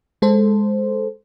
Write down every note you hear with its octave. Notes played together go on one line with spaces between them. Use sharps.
G#3 A4 C5